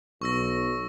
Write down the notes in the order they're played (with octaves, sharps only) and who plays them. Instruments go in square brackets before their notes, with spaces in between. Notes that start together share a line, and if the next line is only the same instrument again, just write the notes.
[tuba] B1 [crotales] C#6 E6 A#6